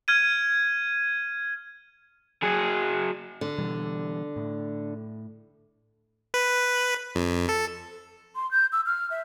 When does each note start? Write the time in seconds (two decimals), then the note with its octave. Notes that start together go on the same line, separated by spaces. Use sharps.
0.08 F6 G#6 D#7
2.43 F#3 G#4
3.41 D3
3.58 B2 E3 G3
4.36 A2
6.34 B4
7.15 F2
7.49 A4
8.36 C6
8.51 G6
8.72 E6
8.86 F6
9.11 E5